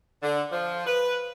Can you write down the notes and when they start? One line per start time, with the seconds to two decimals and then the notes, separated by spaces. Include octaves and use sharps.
0.22 D3
0.52 F3
0.87 B4